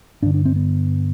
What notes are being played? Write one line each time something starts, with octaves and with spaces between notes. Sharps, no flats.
G2 D3 D4
D4
C4
B3